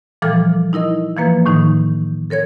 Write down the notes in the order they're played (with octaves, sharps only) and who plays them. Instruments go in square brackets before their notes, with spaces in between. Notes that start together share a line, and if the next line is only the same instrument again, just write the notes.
[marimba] A#2 E3 F3 G3 A4 F6
D#4 E4 A#4 D#5
E3 F3 A#3 B4
A2 D#3 D#4
A4 A#4 C#5 G#6